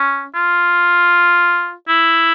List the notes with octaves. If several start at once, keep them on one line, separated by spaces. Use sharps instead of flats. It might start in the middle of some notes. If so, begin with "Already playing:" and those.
Already playing: C#4
F4
E4